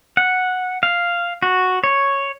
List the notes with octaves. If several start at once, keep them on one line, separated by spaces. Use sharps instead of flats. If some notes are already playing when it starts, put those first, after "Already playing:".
F#5
F5
F#4
C#5